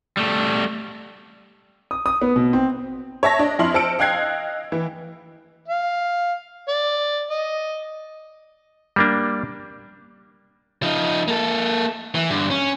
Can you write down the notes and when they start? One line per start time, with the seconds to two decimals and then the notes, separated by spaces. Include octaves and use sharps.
0.17 G3 A3
1.91 D#6
2.06 D#6
2.22 B3
2.36 B2
2.53 C4
3.23 C#5 E5 A5 A#6
3.39 D4 D#5
3.59 F2 E4 C6 F6 F#7
3.74 C5 A5 E6 C#7 D7
3.99 D#5 F5 G5 F#6 G#6 C7
4.72 E3
5.68 F5
6.68 D5
7.31 D#5
8.96 G3 A#3 D4
10.83 F3 D#4
11.28 A#3 A4
12.15 E3
12.30 G2 D3
12.50 C#4